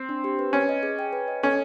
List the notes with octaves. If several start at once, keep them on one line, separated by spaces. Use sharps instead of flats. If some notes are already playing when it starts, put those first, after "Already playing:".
Already playing: C4
D4
G4
B4
C#4 B4
D#5
G#4
G5
B4
D#5
C#4 A4